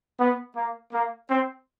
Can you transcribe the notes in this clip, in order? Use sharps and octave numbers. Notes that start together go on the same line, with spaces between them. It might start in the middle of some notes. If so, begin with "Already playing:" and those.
B3
A#3
A#3
C4